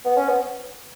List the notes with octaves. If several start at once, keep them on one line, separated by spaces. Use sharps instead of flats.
B3
C#4
B3